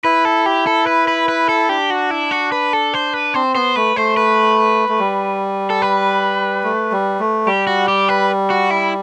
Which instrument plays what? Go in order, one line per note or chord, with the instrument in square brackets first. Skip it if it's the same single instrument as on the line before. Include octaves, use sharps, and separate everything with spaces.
[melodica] E4 [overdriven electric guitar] B4
[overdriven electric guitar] A4
G4
A4
B4
B4
B4
A4
[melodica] D4 [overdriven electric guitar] G4
[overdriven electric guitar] F#4
E4
F#4
B4
A4
C5
B4
[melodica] C4 [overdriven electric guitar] C5
[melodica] B3 [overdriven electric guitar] C5
[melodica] A3 [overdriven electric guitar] B4
[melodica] A3 [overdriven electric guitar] C5
[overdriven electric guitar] B4
[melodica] A3
G3
[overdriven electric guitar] A4
B4
[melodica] A3
G3
A3
[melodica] G3 [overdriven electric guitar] G4
[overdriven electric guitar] F#4
G4
B4
F#4
E4